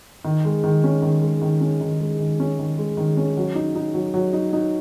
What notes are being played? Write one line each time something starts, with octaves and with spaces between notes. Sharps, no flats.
D#3
G#3
D#3
C#4
D#3
G#3
D#3
C#4
D#3
G#3
D#3
C#4
D#3
G#3
D#3
C#4
F#3
D#4
D#4
F#3
F#3
D#4
D#4